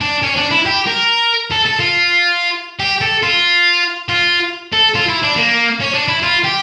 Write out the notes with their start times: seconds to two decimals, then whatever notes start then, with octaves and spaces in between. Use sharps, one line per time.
0.01 D4
0.23 C#4
0.37 D4
0.51 E4
0.65 G4
0.87 A#4
1.52 A4
1.66 A4
1.80 F4
2.79 G4
3.01 A4
3.23 F4
4.09 F4
4.73 A4
4.95 F4
5.09 E4
5.23 D4
5.37 A#3
5.81 C#4
5.94 D4
6.08 E4
6.23 F4
6.44 G4